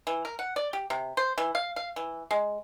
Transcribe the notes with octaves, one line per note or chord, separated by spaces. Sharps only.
E3
A#4
F#5
D5
G4
C3
C5
E3
F5
F5
E3
G#3